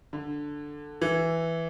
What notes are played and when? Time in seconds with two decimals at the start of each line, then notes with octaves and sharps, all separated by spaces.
0.13 D3
1.02 E3